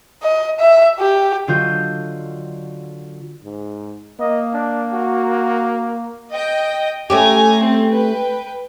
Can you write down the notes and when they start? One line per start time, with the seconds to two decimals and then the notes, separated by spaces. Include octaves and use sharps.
0.23 D#5
0.60 E5
1.00 G4
1.48 D3 F#3 F4 F#4 D#5 G6
3.44 G#2
4.20 A#3 D#5
4.54 D4
4.93 F#4
6.32 D#5 G5
7.10 A3 C#4 G4 G#5 A#5
7.62 C4
7.94 B4 G5